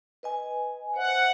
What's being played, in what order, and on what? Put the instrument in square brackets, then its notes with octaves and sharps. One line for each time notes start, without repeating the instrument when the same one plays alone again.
[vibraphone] B4 D#5 G#5
[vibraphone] C5 E5 [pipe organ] F#5